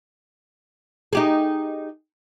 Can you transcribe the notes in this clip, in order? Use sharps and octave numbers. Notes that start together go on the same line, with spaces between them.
D#4 G4 G#4